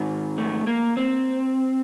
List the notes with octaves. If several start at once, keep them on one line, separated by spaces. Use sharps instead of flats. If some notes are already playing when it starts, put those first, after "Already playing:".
Already playing: G#2 D#3
A3
A#3
C4